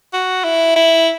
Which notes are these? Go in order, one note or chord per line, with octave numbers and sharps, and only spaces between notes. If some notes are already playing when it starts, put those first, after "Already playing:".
F#4
E4
E4